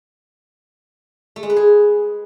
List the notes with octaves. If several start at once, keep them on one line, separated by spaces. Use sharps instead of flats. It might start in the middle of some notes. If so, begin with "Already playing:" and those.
A3
G#3
B4
G#4